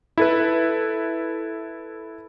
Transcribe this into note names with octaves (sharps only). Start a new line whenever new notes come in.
E4 A4 B4